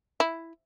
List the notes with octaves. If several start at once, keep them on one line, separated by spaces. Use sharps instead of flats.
E4